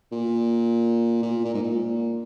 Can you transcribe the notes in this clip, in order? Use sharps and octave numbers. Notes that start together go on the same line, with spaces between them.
A#2
A#2
A#2
G#2
A#2